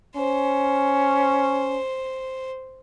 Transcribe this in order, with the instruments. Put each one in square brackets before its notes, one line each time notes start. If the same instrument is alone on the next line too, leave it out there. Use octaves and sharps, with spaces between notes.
[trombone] C#4 [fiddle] C5